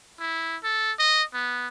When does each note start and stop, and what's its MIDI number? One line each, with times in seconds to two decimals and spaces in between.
0.20 0.57 64
0.63 0.92 69
0.99 1.23 75
1.34 1.68 59